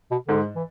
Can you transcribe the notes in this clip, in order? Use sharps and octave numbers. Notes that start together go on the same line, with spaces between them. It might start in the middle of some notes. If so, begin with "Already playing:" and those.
B2
G#2 D3
E3